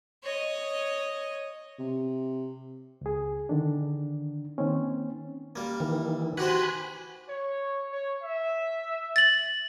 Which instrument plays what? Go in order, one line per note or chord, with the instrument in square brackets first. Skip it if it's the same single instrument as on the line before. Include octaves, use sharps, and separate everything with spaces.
[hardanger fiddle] C#5 D#5
[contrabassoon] C3
[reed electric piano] C#2 G#4
D3 D#3 D4
D#3 A#3 C4 C#4
[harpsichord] G3 A#3
[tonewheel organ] D#3 E3
[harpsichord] F#4 G4 C5 [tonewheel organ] G#5 B5 F#6
[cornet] C#5
C#5
E5
[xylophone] A6 F#7